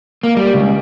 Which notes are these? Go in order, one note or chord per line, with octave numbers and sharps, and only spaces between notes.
A#3
G3
C#2